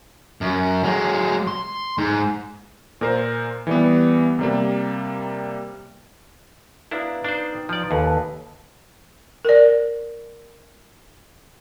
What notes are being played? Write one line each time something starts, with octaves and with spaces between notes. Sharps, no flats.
F#2
F#3 G#3
C6
G#2
A#2 A#4 C5
E3 G3 B3
C3 G3 A#3
B3 D4 E4 F5 A#5
D4 D#4 C5
G5
F3 D5
D#2 A4 B4 G#5
A#4 D5